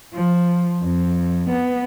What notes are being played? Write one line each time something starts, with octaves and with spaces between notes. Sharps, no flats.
F3
F2
B3